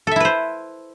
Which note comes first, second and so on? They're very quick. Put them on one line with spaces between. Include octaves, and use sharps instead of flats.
A4 E5 E4 B4 C5